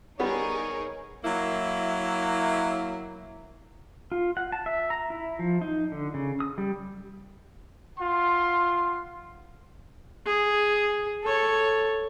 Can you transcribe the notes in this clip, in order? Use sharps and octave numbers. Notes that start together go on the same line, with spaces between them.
G3 B3 D#4 G#4 A#4 C#5
F#3 A#3 E4
F4
F#5
A5
E5
A#5
E4
F3
D#4
D3
C#3
D#6
G3
F4 F#5 C6
G#4
A4 C#5